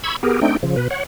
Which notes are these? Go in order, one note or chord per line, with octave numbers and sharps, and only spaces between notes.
B5 C#6 E6 G#6
B3 G4 G#4 A#4
A3 C4 D4 D#4 G5
C#3 F3
B2 B4
C#5 F#5